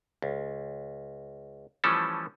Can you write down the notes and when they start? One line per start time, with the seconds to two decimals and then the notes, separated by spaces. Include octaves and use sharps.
0.22 C#2
1.84 E3 F3 G3 A3 C#4 A4